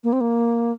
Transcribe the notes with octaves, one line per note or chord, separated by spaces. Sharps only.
A#3
C4
A#3